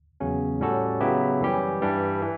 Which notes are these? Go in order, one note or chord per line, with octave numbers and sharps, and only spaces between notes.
E2 C#3 F#3 C#4
A2 G3 C#4 F#4 A4
C#3 F#3 B3 E4 G4
F#2 E3 G3 C#4 G4
G2 E3 G3 D4
E3